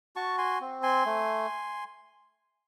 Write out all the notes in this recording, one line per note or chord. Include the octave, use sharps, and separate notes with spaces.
F#4 A5 C#6
G#5 C6
C4
G#5 C6
A3